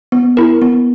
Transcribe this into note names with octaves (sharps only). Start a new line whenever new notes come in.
B3
E4 A#4
B3